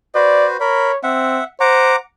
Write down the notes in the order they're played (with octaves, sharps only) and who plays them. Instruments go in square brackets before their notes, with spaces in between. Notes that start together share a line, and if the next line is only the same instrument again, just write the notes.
[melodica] F#4 B4 C5 [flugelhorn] D5
[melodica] A#4 B5 [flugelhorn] C#5
[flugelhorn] C4 [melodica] E5 F#5
[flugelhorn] C5 [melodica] F#5 A#5 D6